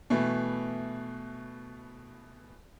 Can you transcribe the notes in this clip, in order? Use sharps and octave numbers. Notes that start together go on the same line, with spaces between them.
B2 E3 A3